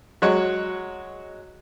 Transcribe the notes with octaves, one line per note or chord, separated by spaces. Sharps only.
F#3 G#3 F#4 C#5